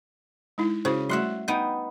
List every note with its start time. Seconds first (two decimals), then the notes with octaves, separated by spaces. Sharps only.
0.58 G#3 D#4 E4
0.85 C#3 E4 F#4 C5
1.09 G3 A3 F#4 E5 F#5 C6
1.48 B3 D#4 G5